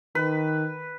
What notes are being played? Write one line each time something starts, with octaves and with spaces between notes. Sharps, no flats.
D#3 B4